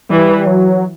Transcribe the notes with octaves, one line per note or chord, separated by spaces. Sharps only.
E3 G3
F#3